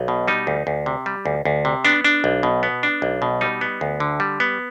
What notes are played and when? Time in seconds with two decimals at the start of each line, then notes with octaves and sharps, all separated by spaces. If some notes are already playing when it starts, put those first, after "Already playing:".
Already playing: B1
0.08 B2
0.28 G3 D#4
0.47 D2
0.67 D2
0.86 C3
1.06 G3
1.26 D2
1.45 D2
1.65 C3
1.84 B3 D4
2.05 D4
2.24 B1
2.43 B2
2.63 B3
2.83 D4
3.02 B1
3.22 B2
3.41 G3 D#4
3.61 B3
3.81 D2
4.00 D3
4.20 G3
4.40 B3